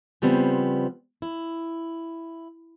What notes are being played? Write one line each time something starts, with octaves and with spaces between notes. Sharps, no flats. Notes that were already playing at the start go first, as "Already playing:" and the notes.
C#3 F3 G3 B3 C4
E4